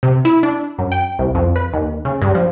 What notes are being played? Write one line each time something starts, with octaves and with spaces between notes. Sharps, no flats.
C3
E4
D4
F#2
G5
C2
F2
B4
D#2
C#3
G2
F3